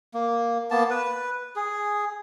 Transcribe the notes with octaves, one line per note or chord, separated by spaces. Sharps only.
A#3
A#3 B3 A5
B4
G#4